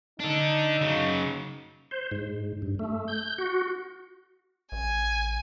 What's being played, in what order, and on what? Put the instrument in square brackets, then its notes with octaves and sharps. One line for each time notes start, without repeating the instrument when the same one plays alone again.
[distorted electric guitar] D4 A4 [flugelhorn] D#4
[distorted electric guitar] C#3 F#3
[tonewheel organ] C5
G#2
G2
A3
G6
F#4
[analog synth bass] A1 [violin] G#5